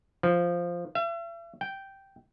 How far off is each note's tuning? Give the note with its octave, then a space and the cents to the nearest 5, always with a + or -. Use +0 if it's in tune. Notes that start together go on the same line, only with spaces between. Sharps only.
F3 -5
E5 +40
G5 -5